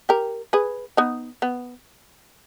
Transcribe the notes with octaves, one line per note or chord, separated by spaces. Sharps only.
G4 A#4
G#4 B4
B3 D#4
B3